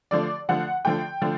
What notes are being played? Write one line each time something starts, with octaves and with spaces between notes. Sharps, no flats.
D3 F3 A3 D5
D3 F3 A3 F#5
D3 F3 A3 G5
D3 F3 A3